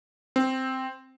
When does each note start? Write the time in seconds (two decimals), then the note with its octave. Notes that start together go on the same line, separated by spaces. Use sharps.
0.36 C4